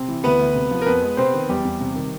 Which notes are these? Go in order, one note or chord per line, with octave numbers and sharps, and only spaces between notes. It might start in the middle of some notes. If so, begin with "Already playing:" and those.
Already playing: C3 C4
E3
D2 B3 B4
D2
C3
F3
A#4
F2 B3 B4
G#3
C3 C4 C5
D#3
E2 G3 G4
E2
C3
D#3